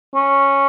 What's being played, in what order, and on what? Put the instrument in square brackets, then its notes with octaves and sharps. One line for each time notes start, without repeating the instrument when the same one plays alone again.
[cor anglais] C#4